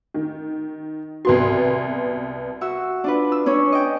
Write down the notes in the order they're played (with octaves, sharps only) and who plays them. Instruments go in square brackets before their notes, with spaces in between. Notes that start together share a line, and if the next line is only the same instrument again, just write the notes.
[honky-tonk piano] D#3
[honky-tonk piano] C2 B3 C6 [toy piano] F#4
[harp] F#4 E5 E6
D4 F4 B4
E6
C#4 D4 C#5
D#5 G5